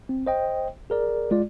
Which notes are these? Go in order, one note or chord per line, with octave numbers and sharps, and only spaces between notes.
C4
C5 D#5 G5
G#4 A#4 D5
G#3 F4 D5